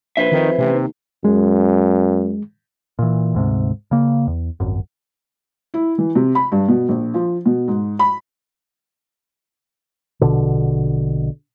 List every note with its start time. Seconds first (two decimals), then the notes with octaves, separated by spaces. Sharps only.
0.17 A#1 B4 C5 E5
0.32 F2 D#3
0.58 A1 C3
0.74 D#2
1.25 F#2 G#3
2.99 A#2 E3
3.34 D2 G#2 C3
3.91 C#3 A#3
4.27 E2
4.60 D#1 G#1 F#2
5.74 E4
5.98 E3
6.15 C3
6.35 B5
6.52 G2
6.68 B2
6.89 A#1
7.14 F3
7.46 B2
7.68 G#2
7.99 B5
10.21 A#1 B2 D3